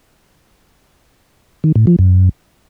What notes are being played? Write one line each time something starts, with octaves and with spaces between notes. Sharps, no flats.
D#3
A2
F3
F#2